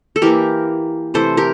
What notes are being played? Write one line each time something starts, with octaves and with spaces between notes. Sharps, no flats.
A4
E3 A#3 G4 A#4
C3 E3 A3 A4 C5
G4 A#4